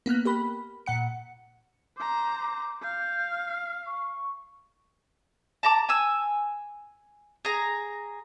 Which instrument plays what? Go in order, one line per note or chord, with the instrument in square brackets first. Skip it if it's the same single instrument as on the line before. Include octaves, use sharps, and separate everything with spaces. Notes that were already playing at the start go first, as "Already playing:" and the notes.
[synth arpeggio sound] A#3 B3 F6 F#6
G4 A#4 B5
A#2 F#5 C#7
[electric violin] C5 A#5 [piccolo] D6
[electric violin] F5 [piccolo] G6
[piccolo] F6
C#6
[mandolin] A5 A#5 D6
G#5 E6
G#4 A#5